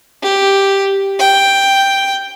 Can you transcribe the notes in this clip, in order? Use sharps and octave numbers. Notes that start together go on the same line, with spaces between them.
G4
G5